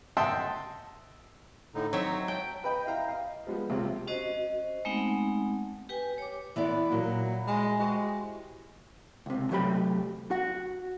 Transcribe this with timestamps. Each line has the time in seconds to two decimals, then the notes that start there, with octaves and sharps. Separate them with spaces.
0.17 D#5 E5 F#5 G5 A5 C6
1.75 A2 D3 D#4
1.93 F#3 C4 D#4 C#5 E5
2.28 G5 A5
2.64 B4 D#5 G5 B5
2.86 E4 F5 G5 A#5
3.08 D#5 F5
3.47 F3 G3 G#3 B3
3.70 C#2 C3 F3
4.07 C#4 F#4 C5 D#5
4.85 G#3 A3 B3 C4 D#4 F#5
5.89 G4 B4 G5 G#5
6.18 C#5 D6
6.56 E3 B3 E4 D5 B5 C6
6.92 A#2 F#3
7.47 G#3 G#5
7.79 G#3 F#4 G4 C5
9.26 C#2 C3
9.51 C3 F#3 A3 G4 B5
10.31 F#4 F#5